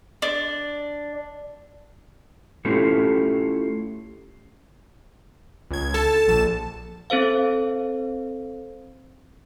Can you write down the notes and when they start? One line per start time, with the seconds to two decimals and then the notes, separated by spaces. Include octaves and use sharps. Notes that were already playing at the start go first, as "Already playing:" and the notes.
0.22 D4
2.65 A3 C#4 E4 F4 G4 A4
5.70 C#2 G#6
5.94 A4 A5
6.28 A#1 A5 E7
7.10 C4 A4 C5 F5